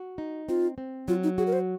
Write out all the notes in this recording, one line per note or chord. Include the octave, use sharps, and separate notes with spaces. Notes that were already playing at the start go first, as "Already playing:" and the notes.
Already playing: F#4
D#4
C4 F4
C4
F#3 F4
D#4
F#4 G#4
A#4
C5